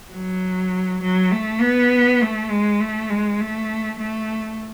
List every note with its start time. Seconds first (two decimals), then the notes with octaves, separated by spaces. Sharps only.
0.13 F#3
1.02 F#3
1.32 A3
1.62 B3
2.21 A3
2.50 G#3
2.81 A3
3.10 G#3
3.41 A3
3.99 A3